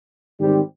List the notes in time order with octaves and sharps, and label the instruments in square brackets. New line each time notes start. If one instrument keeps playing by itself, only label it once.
[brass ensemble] G#2 D#3 G3 C4 G4